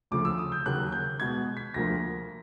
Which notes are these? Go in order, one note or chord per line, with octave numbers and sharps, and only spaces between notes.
D2 C#3 F3 A3 D6
E6
D#6
G6
D#2 C#3 F#3 A#3 F#6
G6
B2 G#3 B3 G#6
B6
D2 D3 F3 A#3 A#6